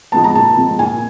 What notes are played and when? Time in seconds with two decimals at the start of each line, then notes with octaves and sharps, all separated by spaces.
0.12 F3 G#3 B3 A5
0.24 A#5
0.35 A#2 A5
0.57 F3 G#3 B3
0.79 A#2 G#5